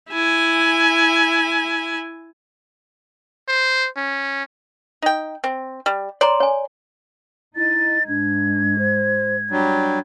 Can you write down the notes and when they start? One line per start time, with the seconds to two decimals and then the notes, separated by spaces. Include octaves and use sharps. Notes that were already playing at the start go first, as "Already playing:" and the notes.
0.10 E4 G#5
3.49 C5
3.97 C#4
5.02 D#4 G5
5.44 C4
5.86 G3
6.21 C#5 D5 A#5 C6
6.40 C#5 G#5
7.56 D#4 E4 A6
8.08 G#2 D4 G#6
8.78 C5
9.50 F#3 G3 D4